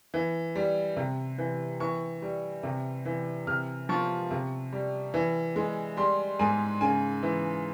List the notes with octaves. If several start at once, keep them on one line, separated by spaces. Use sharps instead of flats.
E3
G3
C3
E3
E3 C#6
G3
C3
E3
C3 F6
F3 C#6
C3
G3
E3
G#3
G3 C6
G#2 G#5
C#3 G#5
E3